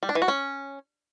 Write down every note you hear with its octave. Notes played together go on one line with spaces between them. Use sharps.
G3
D4
E3
F#4
C#4